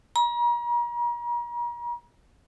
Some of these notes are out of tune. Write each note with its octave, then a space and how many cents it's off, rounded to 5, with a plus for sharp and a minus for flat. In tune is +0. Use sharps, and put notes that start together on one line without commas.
A#5 +40